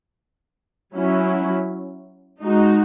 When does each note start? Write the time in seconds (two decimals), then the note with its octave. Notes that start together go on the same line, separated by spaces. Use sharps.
0.95 F#3 C#4 E4
2.42 G#3 D#4 F#4